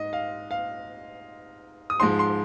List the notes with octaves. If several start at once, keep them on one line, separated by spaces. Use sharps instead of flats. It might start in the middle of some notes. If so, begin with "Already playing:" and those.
Already playing: G#2 D#5
F5
F5
D#6
G#2 F3 G#3 C6
C6